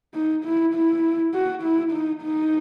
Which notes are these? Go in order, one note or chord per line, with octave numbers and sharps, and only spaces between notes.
D#4
E4
E4
F#4
E4
D#4
D#4